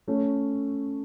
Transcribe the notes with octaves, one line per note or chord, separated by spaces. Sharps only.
A3 C#4